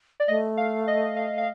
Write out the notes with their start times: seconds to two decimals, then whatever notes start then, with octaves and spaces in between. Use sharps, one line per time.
0.20 D5
0.28 A3 D#5
0.57 F5
0.88 D#5
1.17 F5
1.38 F5